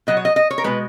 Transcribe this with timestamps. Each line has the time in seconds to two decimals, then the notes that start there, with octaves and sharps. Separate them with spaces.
0.07 B2 F#3 D#5
0.17 C#5
0.25 D#5
0.36 D#5
0.51 C#5
0.58 A#4
0.64 B2 G#3 B4